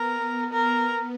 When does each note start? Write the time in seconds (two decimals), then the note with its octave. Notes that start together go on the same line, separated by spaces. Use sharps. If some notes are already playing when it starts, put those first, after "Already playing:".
Already playing: B3 A#4
0.53 A#4